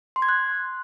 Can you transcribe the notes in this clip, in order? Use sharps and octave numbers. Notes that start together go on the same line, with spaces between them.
C6
G#6
F#6